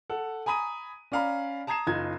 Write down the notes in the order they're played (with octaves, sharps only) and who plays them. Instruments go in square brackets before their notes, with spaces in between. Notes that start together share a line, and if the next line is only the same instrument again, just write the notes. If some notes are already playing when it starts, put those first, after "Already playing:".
[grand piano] A4 F#5
G#5 A#5 B5 D#6 D#7
C#4 D5 F5 A#5 B5
A5 A#5 D#6 G#6 C7 E7
F#1 D#4 F4 G#6